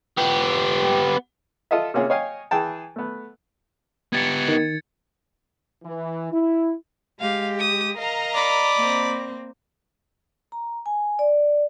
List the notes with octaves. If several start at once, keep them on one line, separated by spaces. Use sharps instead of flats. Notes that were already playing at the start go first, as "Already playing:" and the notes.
B3 G4
F4 A4 D#5 E5
C3 A#3 C#4 F4 G#4
C#5 D#5 F5 G5 G#5
E3 G#4 G5 A5
A3 B3
B3 G4 G#6 A6 C#7
D#3
E3
E4
G#3 G4 F5
D#6
A#4 D#5 F5 A#5
D5 B5
A#3 C4
A#5
G#5
D5